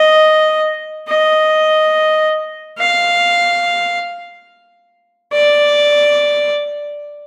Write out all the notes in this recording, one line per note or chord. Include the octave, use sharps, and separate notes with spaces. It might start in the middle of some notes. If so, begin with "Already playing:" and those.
Already playing: D#5
D#5
F5
D5